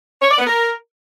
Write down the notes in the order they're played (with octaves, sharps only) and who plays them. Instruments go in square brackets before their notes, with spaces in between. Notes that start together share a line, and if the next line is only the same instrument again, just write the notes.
[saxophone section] C#5
D5
B3
A#4